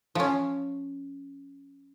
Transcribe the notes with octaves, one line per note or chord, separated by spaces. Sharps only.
F3 C#4